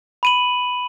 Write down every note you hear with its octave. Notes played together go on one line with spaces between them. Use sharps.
B5 D#7 F#7